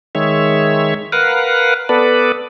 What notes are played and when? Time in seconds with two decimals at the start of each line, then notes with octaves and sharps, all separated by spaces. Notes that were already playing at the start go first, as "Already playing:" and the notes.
0.15 D#3 G#3 C#5 E5
1.12 A#4 B4 F5 F#5
1.89 B3 A4 B4 D5